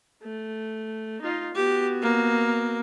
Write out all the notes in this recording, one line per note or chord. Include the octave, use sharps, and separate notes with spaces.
A3
D#4 F4
B3 F#4 G4
A#3